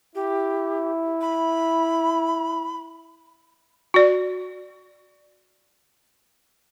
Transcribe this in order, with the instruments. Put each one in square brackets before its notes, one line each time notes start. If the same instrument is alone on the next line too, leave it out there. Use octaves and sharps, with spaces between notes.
[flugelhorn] E4 [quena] G4
[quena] B5
[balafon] F#4 D5